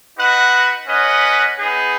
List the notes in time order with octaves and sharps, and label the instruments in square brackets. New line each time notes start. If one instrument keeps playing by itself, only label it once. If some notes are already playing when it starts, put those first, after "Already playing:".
[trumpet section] D#4 F#4 B4 F#5
C#4 B4 D#5 F#5
B3 D#4 G#4